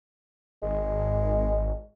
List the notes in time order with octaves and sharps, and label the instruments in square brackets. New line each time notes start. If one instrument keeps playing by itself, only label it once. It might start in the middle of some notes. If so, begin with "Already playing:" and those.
[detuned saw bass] G#1 [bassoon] G#3